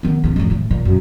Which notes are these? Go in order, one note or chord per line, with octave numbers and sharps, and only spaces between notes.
D#3 B3
A1 C#3
F2 A2
A2 D3
A#2
F#2